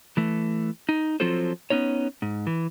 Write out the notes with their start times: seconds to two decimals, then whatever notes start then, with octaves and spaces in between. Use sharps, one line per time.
0.17 E3 A3
0.89 D#4
1.20 F3 F#3 C4 F4 A4 C5
1.70 B3 C#4 D#4 C#5
2.22 G#2
2.47 E3